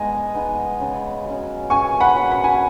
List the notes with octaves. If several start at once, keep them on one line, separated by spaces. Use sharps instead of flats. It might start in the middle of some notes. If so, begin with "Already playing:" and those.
Already playing: G#3 B3 D#4 G#4 D#5 G#5
B3 D#4 G#4
C#3
F#3
C#4
C#3 G#5 C#6
F#5 B5
F#3 C#4
B5
G#5